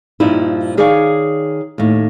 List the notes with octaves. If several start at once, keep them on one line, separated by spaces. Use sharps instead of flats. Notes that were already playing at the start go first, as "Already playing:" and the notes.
G2 A#2 F3 G3 D#4 E4
D#3 G#4 C#5 D5 F5 G#5
D#2 A2